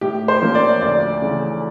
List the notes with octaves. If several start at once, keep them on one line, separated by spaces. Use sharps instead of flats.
A2 G4
C5
F3 A#3 C#4
D5
D2 D5
C#3 E3 A3 C#4